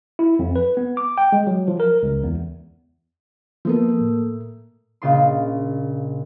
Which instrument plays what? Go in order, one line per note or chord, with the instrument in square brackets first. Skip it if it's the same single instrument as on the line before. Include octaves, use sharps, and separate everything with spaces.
[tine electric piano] E4
F2
B4
B3
D6
G5
G#3
F#3
F3
A#4
C#2
E2
[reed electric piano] F3 B3 [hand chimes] A#3 A4 A#4
[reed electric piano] A2
[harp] A#1 C#3 F4 D#5 C6